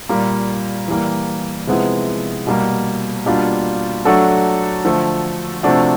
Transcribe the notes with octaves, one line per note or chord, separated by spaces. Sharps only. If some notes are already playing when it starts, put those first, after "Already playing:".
A#2 G3 A#3
E3 G3 A#3
C3 F3 G#3 B3 E4
B2 G3 A#3
B2 G3 A#3 D4 F4
F#3 A3 D4 F#4 A4
D3 F3 A3
C3 F3 A3 D4 F#4